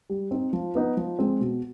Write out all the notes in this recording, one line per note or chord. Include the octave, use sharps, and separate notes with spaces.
G3
C4 D#4
F3
B3 D#4
F3
G#3 C4
B2